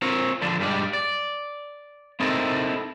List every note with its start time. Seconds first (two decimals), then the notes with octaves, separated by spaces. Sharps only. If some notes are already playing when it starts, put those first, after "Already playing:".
0.02 C4 F4 A#4 C#5
0.42 D3 F3 D4
0.60 G2 G3 G#3 D5
0.93 D5
2.20 C4 D#4 E4 A4 A#4